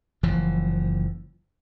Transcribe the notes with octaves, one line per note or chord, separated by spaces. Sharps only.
F#1 E3 F3